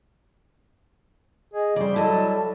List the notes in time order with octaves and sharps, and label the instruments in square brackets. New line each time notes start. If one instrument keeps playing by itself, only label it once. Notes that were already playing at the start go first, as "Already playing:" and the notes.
[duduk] G#4 [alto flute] D#5
[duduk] C#3 [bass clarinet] G3 [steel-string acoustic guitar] C5 D5
[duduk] F#3 [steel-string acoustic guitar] E4 A4 D#5 [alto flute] A5